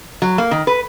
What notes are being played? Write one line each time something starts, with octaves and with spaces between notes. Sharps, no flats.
F#3
A#3
D#3
B4